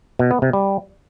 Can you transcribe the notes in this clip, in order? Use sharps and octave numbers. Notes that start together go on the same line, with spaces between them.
B2
B3
C3
G3